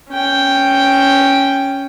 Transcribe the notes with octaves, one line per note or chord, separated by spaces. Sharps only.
C#4 G5